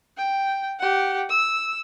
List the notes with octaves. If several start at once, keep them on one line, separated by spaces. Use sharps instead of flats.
G5
G4 F#5
E6